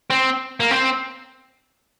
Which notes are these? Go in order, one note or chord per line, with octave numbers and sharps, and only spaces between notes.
C4
A#3
C4